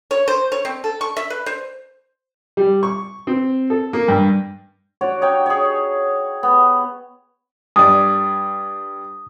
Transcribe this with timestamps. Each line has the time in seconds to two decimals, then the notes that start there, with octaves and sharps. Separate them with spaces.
0.11 C#5
0.28 C5
0.52 C#5
0.65 C4
0.84 A4
1.01 C#6
1.17 E5
1.30 B4
1.46 C5
2.57 G3
2.83 C#6
3.27 C4
3.70 A4
3.93 A#3
4.08 G2
5.01 F#4 C#5 D5
5.21 D#4 C#5 G5
5.46 G#4 C#5
6.43 B3
7.76 G2 D5 D#6